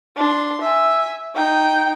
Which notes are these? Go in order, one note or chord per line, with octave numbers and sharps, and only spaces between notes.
D4 C6
E5 G#5
D#4 G5